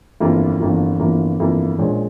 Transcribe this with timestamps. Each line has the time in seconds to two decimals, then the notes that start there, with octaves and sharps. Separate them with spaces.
0.20 G1 F2 E3 A#3 F4
0.59 G1 F2 E3 A#3 F4
1.00 G1 F2 E3 A#3 F4
1.40 G1 F2 E3 A#3 F4
1.78 A#1 A#2 F3 G#3 C#4